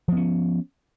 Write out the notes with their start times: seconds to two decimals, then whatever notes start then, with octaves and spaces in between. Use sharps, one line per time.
0.08 F3
0.12 B3
0.17 C#4